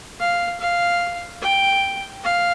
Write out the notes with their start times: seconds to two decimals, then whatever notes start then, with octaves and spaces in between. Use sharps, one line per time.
0.20 F5
0.60 F5
1.41 G5
2.24 F5